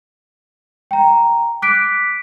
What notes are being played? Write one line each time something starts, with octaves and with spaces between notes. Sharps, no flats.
G5 A#5
D6 F#6 B6 D7